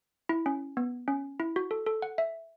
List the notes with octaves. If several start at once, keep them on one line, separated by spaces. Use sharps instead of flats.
E4
C#4
B3
C#4
E4
F#4
A4
A4
F#5
E5